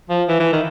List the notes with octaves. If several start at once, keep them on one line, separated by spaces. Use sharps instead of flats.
F3
E3
E3
D#3